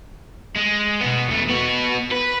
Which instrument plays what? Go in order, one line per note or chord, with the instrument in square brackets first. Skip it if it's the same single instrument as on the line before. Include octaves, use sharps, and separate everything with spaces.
[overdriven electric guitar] G#3
B2 B3
E2 A3
B3 F#4
B4